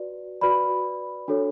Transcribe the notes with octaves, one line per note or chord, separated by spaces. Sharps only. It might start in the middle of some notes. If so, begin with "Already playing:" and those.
Already playing: F#4 B4 D5
F#4 B4 D5 B5
D4 F#4 A4 C#5